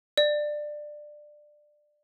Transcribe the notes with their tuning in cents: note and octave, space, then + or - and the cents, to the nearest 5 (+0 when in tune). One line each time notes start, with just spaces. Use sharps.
D5 +20